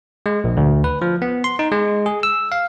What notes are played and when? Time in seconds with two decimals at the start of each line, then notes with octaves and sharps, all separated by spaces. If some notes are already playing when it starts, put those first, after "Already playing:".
0.26 G#3
0.44 A#1
0.57 D2
0.84 B4
1.02 F3
1.22 B3
1.44 C6
1.59 D#4
1.72 G#3
2.06 G#4
2.23 E6
2.52 F5